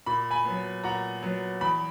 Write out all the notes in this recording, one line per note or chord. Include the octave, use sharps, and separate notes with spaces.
A#2 B5
G#5 B5
F#3 B3
A#2 F#5 A#5
F#3 B3
E2 B5